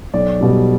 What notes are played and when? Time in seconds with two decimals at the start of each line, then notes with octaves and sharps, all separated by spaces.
0.13 B1 D5
0.41 B2 G3